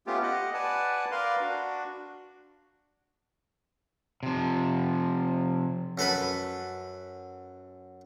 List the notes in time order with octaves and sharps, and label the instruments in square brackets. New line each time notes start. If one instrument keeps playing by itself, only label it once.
[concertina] A3 B3 C#4 F4 G4
G4 D#5 F#5
B4 D5 F#5 G#5 A5
A#4 B4 D5 F5 C6
D4 F#4
[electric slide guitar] C3 F3
[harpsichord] F#2 A4 B4 B5